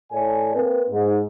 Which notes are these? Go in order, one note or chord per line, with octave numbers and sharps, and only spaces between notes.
A2 A4 C#5 D5 G#5
A#3 C4 B4
G#2